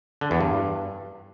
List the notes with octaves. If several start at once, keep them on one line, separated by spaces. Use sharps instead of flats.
D3
E2
G2